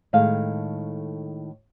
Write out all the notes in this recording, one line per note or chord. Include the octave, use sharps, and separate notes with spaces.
A2 D#3 G#3 A4 F5